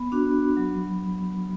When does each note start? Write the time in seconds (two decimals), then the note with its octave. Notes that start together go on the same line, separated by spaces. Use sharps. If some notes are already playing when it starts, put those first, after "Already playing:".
Already playing: B3 B5
0.12 D4 F#4
0.57 F#3